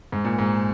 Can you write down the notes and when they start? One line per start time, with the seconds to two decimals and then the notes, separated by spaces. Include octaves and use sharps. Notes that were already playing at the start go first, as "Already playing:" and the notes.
0.12 G#2
0.25 A#2
0.39 G#2